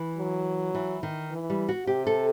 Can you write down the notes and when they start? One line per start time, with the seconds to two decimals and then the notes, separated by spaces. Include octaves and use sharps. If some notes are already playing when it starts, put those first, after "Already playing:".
Already playing: E3
0.18 F#3
0.75 E3
1.03 D#3
1.31 E3
1.50 G3
1.69 F#4
1.87 C3 G4
2.07 A4